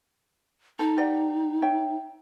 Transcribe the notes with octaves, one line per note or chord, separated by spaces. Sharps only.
D#4 A4 A#5
G4 D5 F#5
C#5 E5 G5